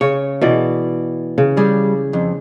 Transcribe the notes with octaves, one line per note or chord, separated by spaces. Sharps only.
C#3 C#5
B2 E3 D5
C#3
G3 G#4
F2